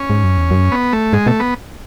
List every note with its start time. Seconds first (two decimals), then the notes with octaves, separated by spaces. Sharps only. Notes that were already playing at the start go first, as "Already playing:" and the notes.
Already playing: C#4
0.10 G#2
0.24 F#2
0.37 E2
0.51 F#2
0.72 B3
0.93 A3
1.13 G#2 G#3
1.26 B2 A3
1.40 B3